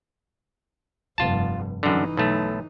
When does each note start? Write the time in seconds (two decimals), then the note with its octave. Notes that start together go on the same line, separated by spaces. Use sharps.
1.18 F1 G2 F4 A5
1.83 F#2 D3 E3 D#4
2.17 B1 A3